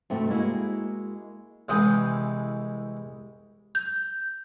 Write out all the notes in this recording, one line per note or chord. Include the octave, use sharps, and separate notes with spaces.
G2 C3 A3 F#4
G#3 A#3 E4 F#4
C2 E3 G#3 G5 D#6
G6